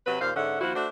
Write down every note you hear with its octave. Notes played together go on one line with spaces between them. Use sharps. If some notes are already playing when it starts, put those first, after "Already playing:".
C3 F#3 B4
D#2 A#2 C5 F5
G#2 D3 C#4 E5 F#5
D#2 F3 E4 F#4
A3 D4 F#4 C5